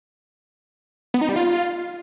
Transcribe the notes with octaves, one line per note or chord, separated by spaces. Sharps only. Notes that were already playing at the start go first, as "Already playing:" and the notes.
B3
D#4
G3
F4